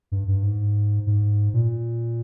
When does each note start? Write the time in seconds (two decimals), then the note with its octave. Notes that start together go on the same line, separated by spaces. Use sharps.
0.12 G2
0.28 G2
0.43 G#2
1.07 G#2
1.54 A#2